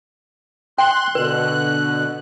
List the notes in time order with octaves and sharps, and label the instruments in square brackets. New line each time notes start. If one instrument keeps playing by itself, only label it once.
[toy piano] G5 [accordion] C6 F#6
[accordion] B2 D3 F#6 [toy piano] B4